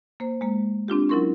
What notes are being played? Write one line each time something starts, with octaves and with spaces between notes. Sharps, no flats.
A#3 C5
G#3 A#3
C4 D4 F4 G4
F#3 C#4 E4 A#4 C6 C#6